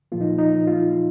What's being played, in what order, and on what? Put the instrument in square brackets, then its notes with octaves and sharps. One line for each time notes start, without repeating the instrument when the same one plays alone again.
[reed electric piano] A#2 F3 A#3 F4
D#4
D#4
F4